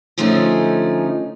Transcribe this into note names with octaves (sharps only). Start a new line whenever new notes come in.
D3 F3 A3 C#4 D#4 G#4